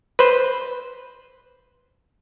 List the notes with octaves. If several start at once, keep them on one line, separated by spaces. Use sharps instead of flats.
B4 C5